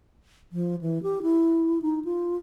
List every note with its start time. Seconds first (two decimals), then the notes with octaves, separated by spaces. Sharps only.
0.52 F3
0.81 E3
1.03 G4
1.23 E4
1.82 D#4
2.05 F4